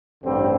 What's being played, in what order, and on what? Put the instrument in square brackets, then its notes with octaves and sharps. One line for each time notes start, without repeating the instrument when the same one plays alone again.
[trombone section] A1 G2 D3 G3 C4